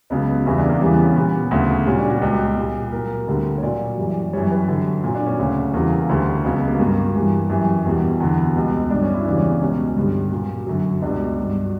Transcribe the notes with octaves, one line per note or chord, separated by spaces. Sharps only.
C#2 C#3 F#3 B3
E2 C#3 E3 G3 E4
D4
A#3
E2 C#3 E3 G3
B3
C#4
A#2 G3 B3
D2 C#3 F#3
A#2 G3 C#4
D4
F#4
C#2 B2 G3 G4
A#2 G3
A#2 F#3 A#4
D2 D3 G3
C#5
A#2 F#3 D5
F#2 E3 G3
F#2 E3 G3 C#5
B4
F#2 D3 G3
A#2 F#3
D4
C#4
D2 C#3 F#3 C#4
E2 C#3 G3 A#3
D2 D3 G3
C#2 C#3 F#3 B3
B3
A#3
G2 F#3 A#3
G2 E3 G3
F#2 E3 G3
E2 B2 G3
E2 D3 F#3 B3
C#2 B2 G3
G2 F#3 D4
C#4
E4
E2 C#3 E3 G3 D4
C#4
B3
C#2 B2 G3 C#4
G2 D3 G3
A#2 F#3
F#2 D3 F#3
C#2 B2 G3 D4
G2 F#3